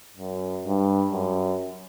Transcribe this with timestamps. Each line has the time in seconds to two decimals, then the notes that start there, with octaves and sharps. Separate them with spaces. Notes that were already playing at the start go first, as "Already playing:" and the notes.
0.17 F#2
0.65 G2
1.12 F#2